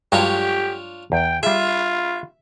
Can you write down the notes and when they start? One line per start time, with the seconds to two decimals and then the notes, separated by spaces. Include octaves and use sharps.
0.12 G2 F#3 G#3 D4 F4 G4 C#5
1.12 E2 G5
1.43 G3 F4 G#4 E5